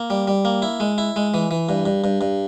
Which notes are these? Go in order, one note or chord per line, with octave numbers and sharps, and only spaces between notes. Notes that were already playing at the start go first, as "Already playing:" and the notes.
Already playing: A#3
G3
G3
A#3
E4
G#3
E4
G#3
E3
E3
G2
G2
G2
G2